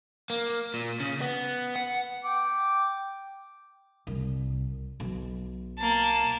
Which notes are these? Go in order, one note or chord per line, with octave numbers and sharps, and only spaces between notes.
A#3
A#2
C#3
B3
F#5
G5 D6
C2
B1
A#3 A5